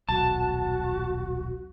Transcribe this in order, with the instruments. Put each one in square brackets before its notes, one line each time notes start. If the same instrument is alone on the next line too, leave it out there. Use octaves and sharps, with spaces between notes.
[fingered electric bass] D#1 B1 [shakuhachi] F#4 [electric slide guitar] A5